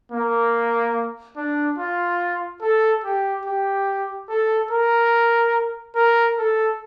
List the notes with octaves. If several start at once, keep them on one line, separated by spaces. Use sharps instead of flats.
A#3
D4
F4
A4
G4
G4
A4
A#4
A#4
A4